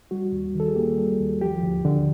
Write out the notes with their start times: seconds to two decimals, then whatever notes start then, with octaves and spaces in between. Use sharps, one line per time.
0.11 G3 F#4
0.32 D#2
0.55 D#3
0.60 A4
0.68 G#4
0.76 A#3 G4
0.98 G3
1.19 D#2
1.41 F3 G4
1.63 D2
1.85 D3